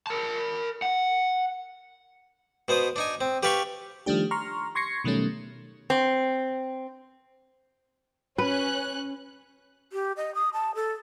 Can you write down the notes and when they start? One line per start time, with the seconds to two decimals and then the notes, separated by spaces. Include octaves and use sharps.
0.07 A#4 A5
0.82 F#5
2.68 B2 B3 C5 D#6
2.96 D4 D#4 G#5
3.21 C4
3.43 G4 B4 F5 A5 B5 C#6
4.06 D#3 F3 G3 A3 D4 G4
4.31 A#5 C6 C#6 F6
4.75 C6 C#6 G#6 A#6 C7 C#7
5.04 B2 D#3 F#3 G3 A3 C#4
5.90 C4
8.38 C#4 B4 F#6
9.93 G4
10.17 D#5
10.35 D#6
10.53 A5
10.75 A4